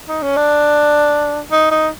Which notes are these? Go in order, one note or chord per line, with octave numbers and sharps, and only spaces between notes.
D#4
C#4
D4
D#4
D#4